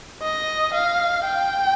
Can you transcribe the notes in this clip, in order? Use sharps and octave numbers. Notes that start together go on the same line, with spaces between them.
D#5
F5
G5